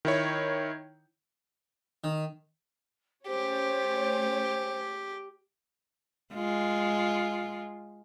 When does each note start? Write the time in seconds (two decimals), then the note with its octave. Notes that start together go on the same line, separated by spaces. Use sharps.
0.05 D#3 E4 C#5
2.04 D#3
3.27 A3 C#4 G4 C5 C#5
6.34 G#3 F4